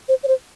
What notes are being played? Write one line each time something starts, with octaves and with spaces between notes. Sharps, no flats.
C5
C#5
C5